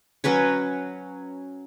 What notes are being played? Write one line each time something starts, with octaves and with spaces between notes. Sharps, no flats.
F#3 C#4 B4 C#5